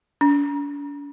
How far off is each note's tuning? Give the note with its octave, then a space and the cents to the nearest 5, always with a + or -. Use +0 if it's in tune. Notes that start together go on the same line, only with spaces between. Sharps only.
D4 -45